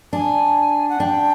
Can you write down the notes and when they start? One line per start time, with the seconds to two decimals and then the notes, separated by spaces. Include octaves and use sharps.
0.13 D4 G#5
0.89 F#5
1.00 D4 G5